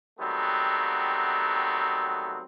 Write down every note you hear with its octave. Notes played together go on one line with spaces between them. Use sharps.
D#3 F#3 G3 A3 B3 C4